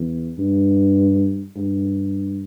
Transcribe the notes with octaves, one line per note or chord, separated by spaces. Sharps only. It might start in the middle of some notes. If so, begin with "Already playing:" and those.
Already playing: E2
G2
G2